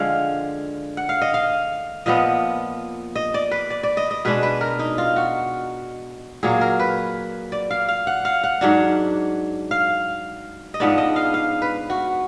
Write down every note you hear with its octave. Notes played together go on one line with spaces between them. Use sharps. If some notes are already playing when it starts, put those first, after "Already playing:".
Already playing: D3 F3 G#3 F5
F#5
F5
D#5
F5
A#2 F3 B3 D#5
D#5
D5
B4
D5
D5
D#5
D#5
B2 G#3 D4 B4
B4
A#4
D#4
F4
F#4
A#2 F#3 A#3 G#4
A#4
B4
D5
F5
F5
F#5
F5
F#5
G#2 F#3 D4
F5
D#5
G#2 F3 B3 D4 D5
D#5
F5
F5
B4
F#4